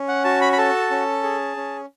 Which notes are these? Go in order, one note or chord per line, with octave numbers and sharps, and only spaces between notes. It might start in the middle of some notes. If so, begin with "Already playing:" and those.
Already playing: C#4
F#5
F#4 A5
B5
B5
A4 A5
C#4
G#4
C#4